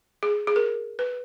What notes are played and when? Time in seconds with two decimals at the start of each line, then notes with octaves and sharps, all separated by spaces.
0.23 G#4
0.47 G#4
0.56 A#4
0.99 B4